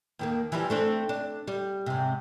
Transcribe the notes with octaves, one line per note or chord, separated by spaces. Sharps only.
D#2 D#3 A#3
E3 F3 G3
A3 C4 D4
D4
G3
G#2 C3